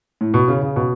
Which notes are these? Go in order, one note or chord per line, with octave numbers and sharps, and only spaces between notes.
A2
B2
C#3
C#3
B2